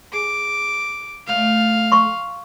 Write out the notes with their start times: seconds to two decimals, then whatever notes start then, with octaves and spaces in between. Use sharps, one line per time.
0.13 G#4 D6
1.27 D2 A3 F5
1.92 C6 C#6